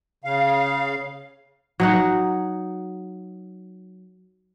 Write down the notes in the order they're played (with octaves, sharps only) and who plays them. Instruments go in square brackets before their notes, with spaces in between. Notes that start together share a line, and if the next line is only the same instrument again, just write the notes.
[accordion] C#3 F5
[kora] F#3 D#4 F#5